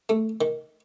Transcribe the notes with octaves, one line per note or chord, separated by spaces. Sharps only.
A3
D#3